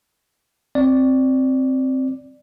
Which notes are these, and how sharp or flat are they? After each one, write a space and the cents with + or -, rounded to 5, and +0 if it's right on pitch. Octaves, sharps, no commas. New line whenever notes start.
C4 +5 D5 +0